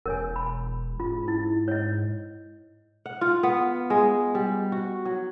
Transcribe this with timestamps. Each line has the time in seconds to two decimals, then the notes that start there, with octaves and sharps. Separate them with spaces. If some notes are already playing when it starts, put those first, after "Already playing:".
0.06 E1 A#4 C#5 G#5
0.36 B5
1.00 G#2 F4
1.28 E4
1.68 C#5 D#5
3.06 F#5
3.21 F4
3.43 B3
3.90 G#3
4.35 G3
4.72 F#4
5.05 F#3